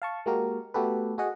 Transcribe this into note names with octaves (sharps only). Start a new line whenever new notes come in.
F5 A5 C#6
G#3 A#3 F#4 G4 A#4
A3 B3 F#4 G4 A4 B4
F#4 G#4 D#5 F#5